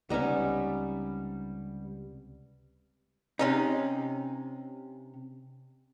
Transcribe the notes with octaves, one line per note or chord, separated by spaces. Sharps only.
C#2 C3 G3 B3 C#4 D#4
C3 C#4 D#4